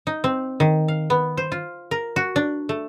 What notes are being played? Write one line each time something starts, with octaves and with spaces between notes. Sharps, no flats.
D#4
C4
D#3
F5
B3
C5
F4
A#4
F#4
D4
A3